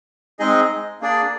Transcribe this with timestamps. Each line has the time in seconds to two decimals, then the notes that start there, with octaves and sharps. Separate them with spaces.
0.39 G#3 C4 D#4 G#4 D#5
1.01 A#3 D4 G#4 D5